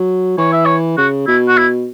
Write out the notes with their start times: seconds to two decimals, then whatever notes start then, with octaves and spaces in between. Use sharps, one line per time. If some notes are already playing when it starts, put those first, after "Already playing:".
Already playing: F#3
0.38 E3 C#5
0.53 E5
0.66 C#5
0.97 C#3 F#4
1.27 B2 E4
1.48 F#4
1.57 E4